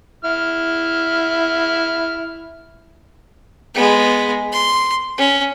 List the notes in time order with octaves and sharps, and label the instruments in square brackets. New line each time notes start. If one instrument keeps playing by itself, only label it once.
[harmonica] E4 F6
[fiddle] G#3 B3
C6
C#4